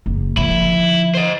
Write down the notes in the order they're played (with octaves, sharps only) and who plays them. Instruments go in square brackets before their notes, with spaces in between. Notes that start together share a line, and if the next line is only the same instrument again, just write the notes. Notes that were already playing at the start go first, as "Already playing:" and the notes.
[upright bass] F#1
[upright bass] D3 F3 [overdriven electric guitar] E4
[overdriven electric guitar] C5 D#5